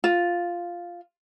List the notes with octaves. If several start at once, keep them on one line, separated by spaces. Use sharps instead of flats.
F4